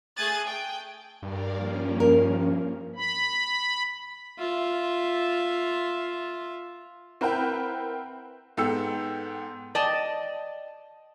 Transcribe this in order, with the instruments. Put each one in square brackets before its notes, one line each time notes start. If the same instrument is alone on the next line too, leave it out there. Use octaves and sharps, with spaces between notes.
[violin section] A3 G#4 D#6 F#6 G#6 A6
G5
[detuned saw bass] G2 [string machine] A#4 D5 F5
[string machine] F3 A#3 C#4
[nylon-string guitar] A#4
[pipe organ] B5
[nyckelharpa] F4 E5
[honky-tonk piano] C4 E4 A#4 B4 F#5 G5
G#2 B3 A4 G5 E6 C#7
[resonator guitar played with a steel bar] D5 D#5 G5 A5